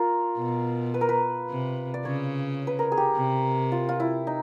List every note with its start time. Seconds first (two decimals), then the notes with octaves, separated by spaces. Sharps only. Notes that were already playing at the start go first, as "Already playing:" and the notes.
Already playing: F4 A#4
0.37 B2
0.94 B4
1.01 A#4
1.09 B4
1.50 C3
1.94 D5
2.05 C#3 C#5
2.67 B4
2.79 A#4
2.92 G#4
2.97 G4
3.15 C3
3.72 F4
3.89 F4
4.00 E4
4.27 D#4